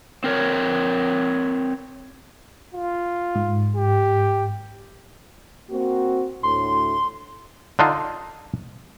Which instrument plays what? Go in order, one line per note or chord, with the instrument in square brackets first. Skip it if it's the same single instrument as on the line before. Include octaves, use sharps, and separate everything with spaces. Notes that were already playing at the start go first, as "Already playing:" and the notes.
[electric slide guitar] C4 A#4 C#5
[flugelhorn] F4
[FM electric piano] G#2
[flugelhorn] G4
[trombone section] A#3 C4 F#4
[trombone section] D2 A2 [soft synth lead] C6
[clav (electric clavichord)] D3 D4 D#4 F4